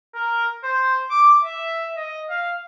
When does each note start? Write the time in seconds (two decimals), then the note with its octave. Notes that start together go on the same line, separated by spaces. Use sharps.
0.15 A#4
0.63 C5
1.10 D6
1.44 E5
1.97 D#5
2.30 F5